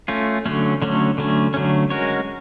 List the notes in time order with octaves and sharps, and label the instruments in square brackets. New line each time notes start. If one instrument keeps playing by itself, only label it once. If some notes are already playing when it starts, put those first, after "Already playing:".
[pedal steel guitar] A3 C#4 F4
D3 F#3 A3 C#4
D3 F#3 A3 C#4
D3 F#3 A3 C#4
D3 F#3 A3 C#4
G#3 C#4 F#4 A#4 C#5